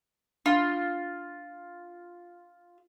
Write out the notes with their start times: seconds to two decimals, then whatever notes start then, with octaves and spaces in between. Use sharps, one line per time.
0.46 D4 F4